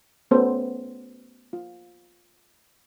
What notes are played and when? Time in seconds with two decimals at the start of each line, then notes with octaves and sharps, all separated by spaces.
0.31 A3 B3 C#4 F#4 A4 C5
1.53 F4